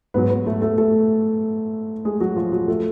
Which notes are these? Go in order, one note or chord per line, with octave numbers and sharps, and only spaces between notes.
G#2 F#3 B3 B4
B3 B4
A3 A4
A3 A4
A3 A4
G#3 G#4
F#3 F#4
F3 F4
F#3 F#4
F3 A3 A4